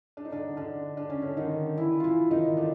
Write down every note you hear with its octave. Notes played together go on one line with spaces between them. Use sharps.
D4
D#4
D3 D4
D3 D4
D4
C#4
D3 D4
D#3 D#4
E3 E4
F4
E3 E4
D#3 D#4
D3 D4